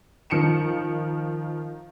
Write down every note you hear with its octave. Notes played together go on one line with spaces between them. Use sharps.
D#3 F3 C#7 D7 E7